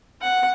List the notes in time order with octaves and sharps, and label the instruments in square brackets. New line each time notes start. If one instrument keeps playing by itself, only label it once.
[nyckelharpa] F#5